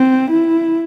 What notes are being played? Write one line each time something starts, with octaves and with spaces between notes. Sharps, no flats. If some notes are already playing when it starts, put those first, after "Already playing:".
Already playing: C4
E4